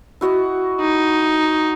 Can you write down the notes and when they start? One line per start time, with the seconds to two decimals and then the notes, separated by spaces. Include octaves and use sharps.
0.21 E4 F#4 D#5
0.80 D#4